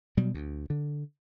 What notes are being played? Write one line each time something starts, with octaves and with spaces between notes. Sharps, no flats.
B2 F#3 G3
D2
D3